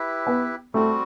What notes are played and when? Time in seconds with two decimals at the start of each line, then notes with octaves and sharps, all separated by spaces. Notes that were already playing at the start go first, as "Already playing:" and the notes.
Already playing: E4 G4 B4 E5
0.27 B3
0.74 G3 A3 C4 F#4